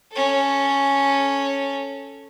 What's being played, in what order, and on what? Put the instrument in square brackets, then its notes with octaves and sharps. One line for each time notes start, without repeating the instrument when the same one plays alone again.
[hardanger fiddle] C#4 A4